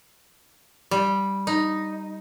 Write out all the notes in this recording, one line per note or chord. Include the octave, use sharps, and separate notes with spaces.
G3
D#4